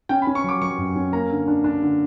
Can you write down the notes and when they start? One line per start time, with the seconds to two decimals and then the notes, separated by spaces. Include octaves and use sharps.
0.09 C#4 G5
0.22 B5
0.27 C#4
0.35 C#6
0.44 F#3 D6
0.61 F#3 C#6
0.78 F#2
0.96 C#4
1.13 A#3 A#5
1.30 D3
1.48 D4
1.64 D4
1.82 D3